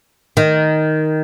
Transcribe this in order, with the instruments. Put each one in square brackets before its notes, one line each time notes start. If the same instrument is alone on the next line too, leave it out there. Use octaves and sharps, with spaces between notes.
[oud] D#3